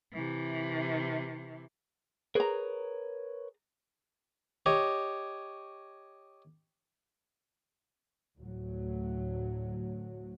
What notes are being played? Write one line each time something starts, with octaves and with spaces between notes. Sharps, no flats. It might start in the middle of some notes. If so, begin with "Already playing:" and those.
C3 E3
G#4 A#4 B4 C#5 A#5
G4 C#5 D#5
D2 A2 F#3